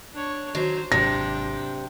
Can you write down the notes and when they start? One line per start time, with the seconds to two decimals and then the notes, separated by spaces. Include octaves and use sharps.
0.14 D4 C#5
0.55 D#3 F#3 C5
0.92 G#1 C3 F#3 D4 G5 A#6